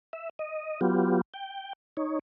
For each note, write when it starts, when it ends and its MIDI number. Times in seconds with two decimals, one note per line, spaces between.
0.13 0.29 76
0.39 0.80 75
0.81 1.21 54
0.81 1.21 59
0.81 1.21 65
0.81 1.21 67
1.34 1.73 79
1.97 2.19 63
1.97 2.19 73